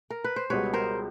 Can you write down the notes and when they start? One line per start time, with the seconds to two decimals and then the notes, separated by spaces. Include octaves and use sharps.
0.10 A#4
0.24 B4
0.36 C5
0.50 C#2 B2 G3 B4 C#5
0.73 A#4 C5